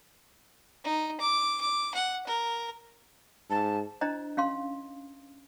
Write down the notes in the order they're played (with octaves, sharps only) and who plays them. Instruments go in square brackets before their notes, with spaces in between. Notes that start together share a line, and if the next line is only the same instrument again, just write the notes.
[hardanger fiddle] D#4
D6
D6
F#5
A#4
[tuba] G#2 [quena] A5
[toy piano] D4 E4 C5 D#5 A#5
C#4 F5 C6